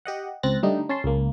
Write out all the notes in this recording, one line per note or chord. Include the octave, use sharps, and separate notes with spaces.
G4 D#5 F#5
C#2 C4 F#6 A6 A#6
D3 G3 A3 D#4
C#4 A5 C6
C#2 A#3